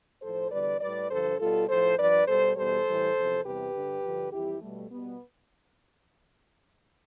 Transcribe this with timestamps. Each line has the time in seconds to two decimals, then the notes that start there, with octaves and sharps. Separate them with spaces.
0.22 A2 F3 A4 C5
0.52 E2 D3 G3 B4 D5
0.81 A2 G3 B4 D5
1.11 G2 D3 F3 A4 C5
1.40 B2 G3 F4 A4
1.69 A2 F3 A4 C5
1.99 G2 F3 B4 D5
2.27 B2 G3 A4 C5
2.57 E2 B2 G3 A4 C5
2.87 A2 E3 G3
3.16 E2 C3 F3
3.45 E2 C3 G3 G4 B4
3.74 G2 D3 G3
4.04 G2 D3 F3
4.33 F2 E3 G3 E4 G4
4.62 B2 G3 A3
4.91 B2 G3 B3